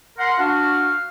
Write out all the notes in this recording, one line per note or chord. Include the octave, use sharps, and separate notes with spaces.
A#4 F#5 C6
D4 F#4 F5